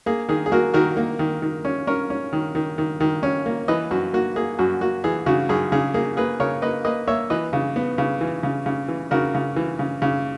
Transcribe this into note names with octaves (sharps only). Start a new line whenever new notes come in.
A#3 G#4
D#3 G#4
G#4
A#3 F#4 A#4
D#3 F#4 A#4
A#3
D#3
D#3
C#4
C#4 A#4 C#5
C#4
D#3
D#3
D#3
D#3
C#4
A#3
E3 B4 D#5
F#2 F#4
A#3 F#4
A#3 G#4
F#2 F#4
A#3 F#4
E3 G#4
C#3 F#4
F#2 G#4
C#3 G#4
A#3 G#4
A#3 G#4 B4
C#3 A#4 C#5
A#3 B4 D#5
A#3 B4 D#5
A#3 C#5 E5
E3 B4 D#5
C#3
B3
C#3
E3
C#3
C#3
E3
C#3 F#4 A#4
C#3
E3
C#3
C#3